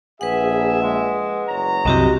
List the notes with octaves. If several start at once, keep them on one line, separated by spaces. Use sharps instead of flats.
A#1 G#4 B4 E5 F#5
G#3
F#1 C#5 A#5
C2 F#2 C3 C4 F#4 G4 D#5